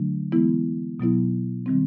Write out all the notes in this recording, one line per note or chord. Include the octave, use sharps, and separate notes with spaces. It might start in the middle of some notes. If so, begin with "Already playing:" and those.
Already playing: D3 F#3 A3 D4
E3 G#3 B3 E4
B2 F#3 B3 E4
D#3 G3 C4